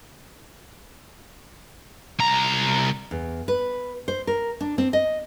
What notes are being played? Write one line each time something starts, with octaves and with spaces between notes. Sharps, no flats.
C2 A#5
E2
B4
C5
A#4
D4
C4
D#5